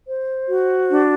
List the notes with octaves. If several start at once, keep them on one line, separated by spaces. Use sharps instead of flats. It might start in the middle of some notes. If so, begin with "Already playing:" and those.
C5
F#4
D4